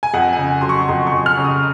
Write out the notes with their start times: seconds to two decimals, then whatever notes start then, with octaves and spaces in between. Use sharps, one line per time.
0.03 G#5
0.14 F2 F#5
0.33 G#5
0.38 C#3
0.61 F#3 C6
0.69 C#6
0.88 F2 C6
1.07 C#6
1.13 F2
1.26 F6
1.38 C#3
1.44 D#6